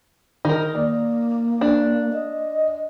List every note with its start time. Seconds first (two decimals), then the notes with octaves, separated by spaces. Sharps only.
0.45 D#3 D#4 A#4
0.75 A#3 D5
1.61 D4
2.14 D#5